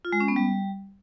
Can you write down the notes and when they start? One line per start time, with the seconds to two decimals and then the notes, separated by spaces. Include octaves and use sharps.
0.05 F4
0.13 G#3
0.20 C#4
0.28 B3
0.36 G3